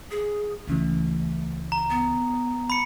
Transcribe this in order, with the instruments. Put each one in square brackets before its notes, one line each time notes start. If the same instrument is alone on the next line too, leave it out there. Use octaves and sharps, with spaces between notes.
[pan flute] G#4
[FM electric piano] C#2 C#3 E3 [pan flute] A3
[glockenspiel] A#5
[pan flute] B3
[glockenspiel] B5 C#7